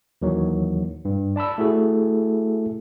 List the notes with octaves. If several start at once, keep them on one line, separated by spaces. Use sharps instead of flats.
D#2 D#3 E3 F#3
G2
D5 A5 B5 E6
A3 E4 F#4 G#4 A4